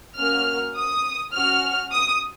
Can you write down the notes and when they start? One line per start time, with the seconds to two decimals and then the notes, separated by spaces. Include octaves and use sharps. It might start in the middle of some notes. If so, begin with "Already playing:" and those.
0.18 A#3 C#4 F#4 F6
0.76 D#6
1.33 C#4 F#4 F6
1.91 D#6